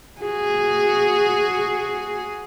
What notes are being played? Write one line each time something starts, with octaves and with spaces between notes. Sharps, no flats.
F#4 G#4